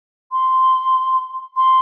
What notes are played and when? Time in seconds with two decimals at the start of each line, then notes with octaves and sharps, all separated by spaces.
0.32 C6
1.56 C6